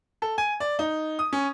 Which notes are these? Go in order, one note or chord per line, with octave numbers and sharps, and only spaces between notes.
A4
G#5
D5
D#4
D#6
C#4